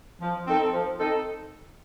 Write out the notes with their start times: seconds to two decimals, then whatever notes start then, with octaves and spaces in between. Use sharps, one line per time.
0.20 F3
0.46 C4 D#4 A4
0.73 F3
0.99 C4 D#4 A4